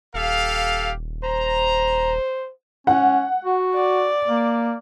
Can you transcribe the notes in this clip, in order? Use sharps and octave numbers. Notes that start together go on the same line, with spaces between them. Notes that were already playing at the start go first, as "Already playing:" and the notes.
D#1 G4 A4 F5
C5 A#5
C#4 F#5
F#4
D5
A#3